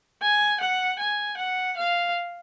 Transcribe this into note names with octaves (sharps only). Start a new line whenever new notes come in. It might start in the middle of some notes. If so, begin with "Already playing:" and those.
G#5
F#5
G#5
F#5
F5